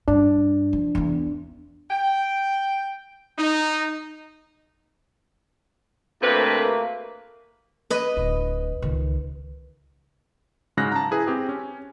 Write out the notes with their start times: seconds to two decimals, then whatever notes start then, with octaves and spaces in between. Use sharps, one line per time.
0.08 G2 D4
0.73 F3
0.95 E2 B3
1.90 G5
3.38 D#4
6.23 D2 C3 A3 A#3 B4
7.90 B4 D#5
8.17 D1
8.82 C#2 D#3
10.77 G#2 C#3 F#3 G#3 F#6 A#6
10.92 A5 A#5
11.11 E4 G#4 B4
11.27 C4 G4 G#4
11.49 C#4